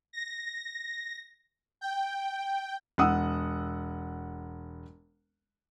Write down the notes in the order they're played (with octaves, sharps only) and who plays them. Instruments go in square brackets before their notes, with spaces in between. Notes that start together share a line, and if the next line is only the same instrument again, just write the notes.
[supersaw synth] A#6
G5
[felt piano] E1 F#5 D#6 E6